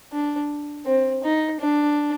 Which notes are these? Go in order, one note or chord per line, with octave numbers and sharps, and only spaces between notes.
D4
C4
D#4
D4